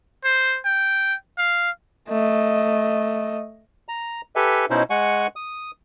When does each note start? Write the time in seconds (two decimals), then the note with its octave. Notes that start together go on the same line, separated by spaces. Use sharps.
0.24 C5
0.65 G5
1.38 F5
2.09 A3 D#5
3.88 A#5
4.36 G4 A4 B4 E5 G#5
4.70 B2 C#4 D#4 E4 C5
4.90 G#3 F#5 G#5 C#6
5.36 D#6